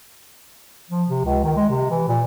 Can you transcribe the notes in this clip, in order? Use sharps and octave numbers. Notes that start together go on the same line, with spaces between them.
F3
C3
C#2
D#3
G#3
C3
E3
A#2